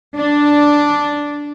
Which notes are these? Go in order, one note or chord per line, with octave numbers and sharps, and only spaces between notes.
D4